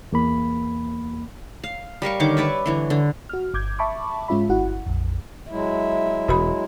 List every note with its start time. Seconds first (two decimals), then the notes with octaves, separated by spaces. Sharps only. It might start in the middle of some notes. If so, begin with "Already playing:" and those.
0.12 E2 A#3 B5
1.64 F5
2.02 G3 A#4 F5 C#6
2.20 D3 D#3 C#5 D6
2.37 B4 C#5 D5 E5
2.66 D3 E3 C#5
2.90 D3
3.29 F#4 F6
3.54 G1 D6 G6 G#6
3.79 E5 A5 B5 C#6 D6
4.28 G#2 G#3 C#4 F4 E5 B5
4.49 G1 E4 F#4 F#5
4.86 A#1 F2
5.51 F#3 G#3 E4 E5
6.28 E1 F#4 B5